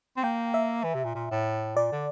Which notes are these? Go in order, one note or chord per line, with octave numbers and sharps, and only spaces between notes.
C4
A#3 G5
E5
E3
C3
A#2
A#2
A2
A#2 D5
D3